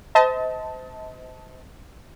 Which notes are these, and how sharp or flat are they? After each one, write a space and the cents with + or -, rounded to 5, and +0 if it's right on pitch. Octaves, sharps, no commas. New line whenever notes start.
C5 -30 D#5 +35 A5 +0